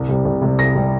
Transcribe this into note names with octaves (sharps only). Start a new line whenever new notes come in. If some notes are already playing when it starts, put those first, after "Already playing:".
Already playing: C2
C3 G3
C2
C3 G3
C2 A#6
C3 G3